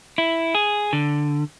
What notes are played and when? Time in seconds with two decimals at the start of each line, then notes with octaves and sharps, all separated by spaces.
0.18 E4
0.55 G#4
0.93 D3